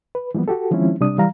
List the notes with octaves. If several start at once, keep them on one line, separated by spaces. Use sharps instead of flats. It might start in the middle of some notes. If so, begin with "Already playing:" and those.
B4
E3 F3 G3 A#3 B3
F#4 G4 A4
D#3 F3 G#3 C4 C#4 E4
C3 G3 D4 D#6
E3 G3 F5 A#5